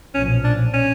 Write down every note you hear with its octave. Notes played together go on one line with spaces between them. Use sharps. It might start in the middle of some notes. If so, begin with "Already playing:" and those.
B1 A#2 F3 C#4
D4
C#4